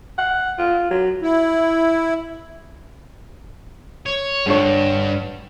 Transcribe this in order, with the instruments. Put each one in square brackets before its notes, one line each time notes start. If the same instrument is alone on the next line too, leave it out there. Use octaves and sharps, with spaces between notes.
[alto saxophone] F#5
F4
F#3
[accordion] E4
[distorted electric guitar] C#5
[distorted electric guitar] G2 [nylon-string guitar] D3 A4 C#5